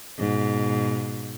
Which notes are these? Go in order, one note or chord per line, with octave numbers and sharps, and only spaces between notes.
G#2 B2